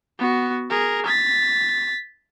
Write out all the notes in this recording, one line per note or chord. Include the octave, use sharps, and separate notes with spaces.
B3 F#4
G#4 A#4
A6 B6